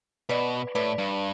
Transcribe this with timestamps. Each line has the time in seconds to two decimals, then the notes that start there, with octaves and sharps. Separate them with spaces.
0.29 B2 B4 D5
0.75 A2 B4 D5
0.98 G2